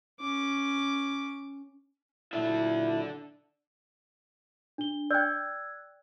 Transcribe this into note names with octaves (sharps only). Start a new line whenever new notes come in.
C#4 D6
A#2 F#3 D4 E4 A4 E5
D4 G7
D5 G5 E6 F#6 G#6